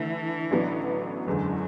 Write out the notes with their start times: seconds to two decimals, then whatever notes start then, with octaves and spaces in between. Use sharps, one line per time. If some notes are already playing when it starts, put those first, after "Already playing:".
Already playing: D3 E3 A3 E4
0.51 A1 A2 F#3 B3 D4
1.27 F#1 E2 D3 F#3 G#3